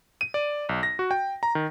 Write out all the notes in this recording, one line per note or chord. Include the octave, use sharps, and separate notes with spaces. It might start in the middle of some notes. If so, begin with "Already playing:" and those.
D#7
D5
B1
A#6
F#4
G5
A#5
D#3